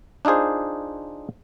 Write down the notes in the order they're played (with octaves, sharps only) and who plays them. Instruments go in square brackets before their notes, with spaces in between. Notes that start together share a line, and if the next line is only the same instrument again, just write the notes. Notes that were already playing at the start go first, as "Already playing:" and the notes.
[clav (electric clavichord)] D4 D#4 F4 G#4 C5